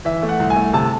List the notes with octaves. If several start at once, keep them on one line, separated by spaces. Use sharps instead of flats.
E3 E5
A3
F#5
C2
G#5
A3
C3 A5